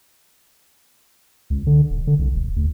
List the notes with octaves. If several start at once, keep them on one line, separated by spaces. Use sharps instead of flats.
C#2
D3
D#1
D3
C2
E1
D2